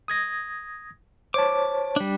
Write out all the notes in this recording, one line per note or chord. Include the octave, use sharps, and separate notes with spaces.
D#6 G#6 A#6
C5 C#5 A5 D6
G3 D4